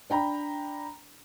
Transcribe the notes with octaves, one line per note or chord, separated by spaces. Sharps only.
D4 G5 A#5 B5